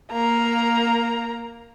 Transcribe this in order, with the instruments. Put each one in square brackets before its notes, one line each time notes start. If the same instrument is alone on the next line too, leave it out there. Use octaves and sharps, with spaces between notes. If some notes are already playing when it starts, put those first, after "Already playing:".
[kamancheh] A#3 A#5